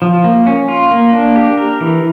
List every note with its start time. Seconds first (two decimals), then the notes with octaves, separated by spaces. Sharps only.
0.02 F3
0.24 A#3
0.46 C#4
0.68 F4
0.91 A#3
1.13 D4
1.36 G4
1.57 A#4
1.81 E3